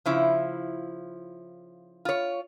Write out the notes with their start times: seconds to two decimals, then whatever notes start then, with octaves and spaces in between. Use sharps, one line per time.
0.06 C#3 F3 E4
2.05 F4 C#5